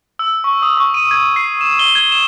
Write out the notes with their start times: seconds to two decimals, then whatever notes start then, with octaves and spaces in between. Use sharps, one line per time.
0.19 E6
0.44 C#6
0.62 D#6
0.77 C#6
0.94 D#7
1.11 G#6
1.36 C7
1.61 E7
1.79 G7
1.95 G#6
2.12 E7